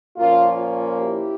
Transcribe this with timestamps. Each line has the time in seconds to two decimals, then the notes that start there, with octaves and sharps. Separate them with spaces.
0.17 A#2 F3 A#3 C#4 F4
0.60 F4
1.00 E4 G4